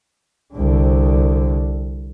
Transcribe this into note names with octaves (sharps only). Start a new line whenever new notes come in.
C2 D3